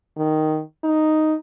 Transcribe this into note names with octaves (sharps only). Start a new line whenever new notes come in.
D#3
D#4